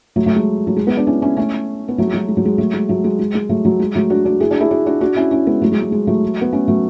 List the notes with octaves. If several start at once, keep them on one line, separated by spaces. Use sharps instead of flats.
F#3 A3
F#3 A3
G#3
F#3
G#3
G#3 B3
B3 D4
C#4 E4
C#4 E4
A3 C#4
B3
F#3 A3
G#3
F#3
G#3
F#3
G#3
F#3 A3
G#3
F#3 A3
G#3
G#3
G#3
F#3 A3
F#3
G#3
F#3 A3
D4 F#4
D4 F#4
E4 G#4
D4 F#4
E4 G#4
D4 F#4
D4 F#4
D4 F#4
C#4 E4
C#4 E4
G#3 B3
F#3 A3
G#3
G#3
G#3
F#3 A3
B3
A3 C#4
F#3 A3